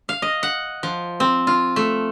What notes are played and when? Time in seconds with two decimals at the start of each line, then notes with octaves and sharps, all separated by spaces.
0.09 F5
0.22 D#5
0.43 F#5
0.83 F3
1.20 C4
1.47 F4
1.76 A3